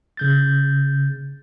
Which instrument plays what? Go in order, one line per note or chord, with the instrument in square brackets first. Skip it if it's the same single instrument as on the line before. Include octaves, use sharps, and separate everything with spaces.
[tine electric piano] C#3 G6 A6